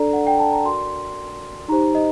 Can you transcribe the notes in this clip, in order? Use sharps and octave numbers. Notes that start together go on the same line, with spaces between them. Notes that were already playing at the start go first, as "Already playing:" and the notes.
Already playing: D4 A4 D5 A#5
F#5
G5
A5
A#5
F#4 A#4 D5 C6
D#4 G4 C5 A#5
D#5